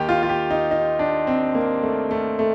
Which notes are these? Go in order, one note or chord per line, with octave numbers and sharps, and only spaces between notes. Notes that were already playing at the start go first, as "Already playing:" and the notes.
Already playing: D#2 D#3 G4
F4
F4
G4
D#4
D#4
D4
C4
A#3
A3
A3
A3